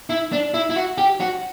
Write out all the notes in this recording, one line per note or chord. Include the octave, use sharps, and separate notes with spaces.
E4
D4
E4
E4
F#4
G4
F#4